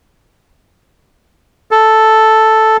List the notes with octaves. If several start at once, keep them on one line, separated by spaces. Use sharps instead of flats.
A4